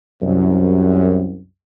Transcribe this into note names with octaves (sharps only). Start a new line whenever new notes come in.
C2 F#2